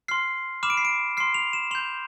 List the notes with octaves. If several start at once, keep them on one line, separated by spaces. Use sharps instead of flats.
C6 F6 C7
B5 D6 F6 E7
D7
C7
D7
C6 F6 C7
F7
E7
C6 G6 F7